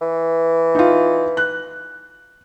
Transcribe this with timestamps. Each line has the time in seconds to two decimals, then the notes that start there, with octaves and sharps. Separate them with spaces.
0.01 E3
0.75 D#4 F4
1.37 F#6